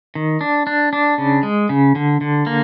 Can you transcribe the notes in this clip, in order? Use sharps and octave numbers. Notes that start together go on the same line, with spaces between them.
D#3
D4
D4
D4
C#3
G#3
C#3
D3
D3
A#3